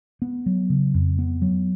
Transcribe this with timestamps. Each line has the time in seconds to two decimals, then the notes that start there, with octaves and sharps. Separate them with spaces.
0.22 B3
0.46 F#3
0.70 C#3
0.94 F2
1.19 B3
1.42 F#3